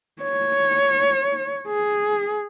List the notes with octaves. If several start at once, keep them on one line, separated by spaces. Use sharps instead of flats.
C#5
G#4